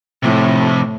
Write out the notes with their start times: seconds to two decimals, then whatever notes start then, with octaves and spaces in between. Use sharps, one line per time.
0.23 F2 A2 C3